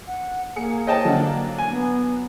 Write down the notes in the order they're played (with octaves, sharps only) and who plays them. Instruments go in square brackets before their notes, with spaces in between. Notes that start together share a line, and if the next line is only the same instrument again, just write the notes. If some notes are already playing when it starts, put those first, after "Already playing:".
[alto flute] F#5
[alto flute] A#3 [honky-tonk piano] G#4 C#7
[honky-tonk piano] G#4 [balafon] C5 C#5 [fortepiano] D#5 G5 A5
[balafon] D3 F#5 [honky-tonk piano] F#3 D4
[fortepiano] G#5
[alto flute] B3